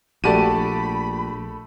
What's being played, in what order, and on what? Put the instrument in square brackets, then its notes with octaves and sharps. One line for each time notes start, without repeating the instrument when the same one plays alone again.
[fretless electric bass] A#1 [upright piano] A3 A5 D#7 [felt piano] F#4 G4 D5 [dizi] B5